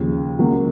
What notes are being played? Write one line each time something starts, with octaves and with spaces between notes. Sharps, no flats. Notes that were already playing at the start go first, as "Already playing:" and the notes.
Already playing: D#2 C#3 F3
C#2 C#3 F#3 A#3